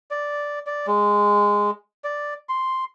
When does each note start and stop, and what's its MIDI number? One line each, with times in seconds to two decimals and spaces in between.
0.11 0.59 74
0.66 0.86 74
0.87 1.71 56
2.04 2.34 74
2.49 2.84 84